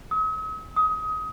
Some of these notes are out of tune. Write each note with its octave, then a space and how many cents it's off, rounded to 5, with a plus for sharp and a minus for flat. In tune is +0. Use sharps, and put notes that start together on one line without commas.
D#6 +45
D#6 +25